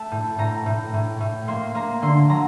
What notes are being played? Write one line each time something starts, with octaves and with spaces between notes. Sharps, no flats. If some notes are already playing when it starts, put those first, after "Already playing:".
Already playing: A3 A5
A2
A2 A#5
A2
A2
A2
A#3 C6
A#3 A#5
D3 C6
F#3 A#5